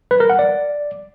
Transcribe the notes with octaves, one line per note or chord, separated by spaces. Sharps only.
B4
A#4
F#5
D5